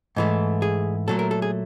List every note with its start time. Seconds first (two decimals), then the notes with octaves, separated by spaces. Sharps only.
0.16 G#2 E3 A3
0.62 G#4
1.08 A#2 F#3 A3 A4
1.19 A#4
1.31 A4
1.42 G#4